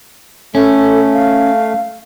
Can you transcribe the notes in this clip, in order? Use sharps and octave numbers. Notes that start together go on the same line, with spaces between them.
A3 C#4 A4
F5